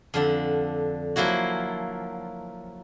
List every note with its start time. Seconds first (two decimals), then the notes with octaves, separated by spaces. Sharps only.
0.14 F2 D3 D4
1.16 F3 F#3 A#3 E4 F#4